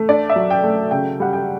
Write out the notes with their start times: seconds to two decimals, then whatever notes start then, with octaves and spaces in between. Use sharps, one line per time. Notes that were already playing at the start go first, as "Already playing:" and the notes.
Already playing: A3
0.09 D4 D5
0.30 E5
0.36 F#3
0.50 G5
0.63 A3
0.91 C#3 G5
1.20 G3 F#5
1.33 G5